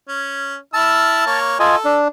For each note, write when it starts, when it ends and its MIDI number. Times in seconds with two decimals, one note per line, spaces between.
0.09 0.56 61
0.74 1.25 64
0.74 1.39 81
0.74 1.25 88
0.74 1.25 89
1.27 1.57 58
1.27 1.57 73
1.59 1.76 65
1.59 1.97 69
1.59 1.76 75
1.59 1.76 80
1.85 2.08 62